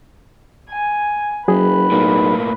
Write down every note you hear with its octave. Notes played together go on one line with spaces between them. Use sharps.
G#5
F#1 F#3 G#4 B4
B1 A2 A#3